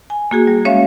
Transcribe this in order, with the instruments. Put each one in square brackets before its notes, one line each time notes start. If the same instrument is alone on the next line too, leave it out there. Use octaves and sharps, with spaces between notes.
[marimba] G#5
A#3 F#4 G#4
G3
G#3 C#4 C#5 E5 F5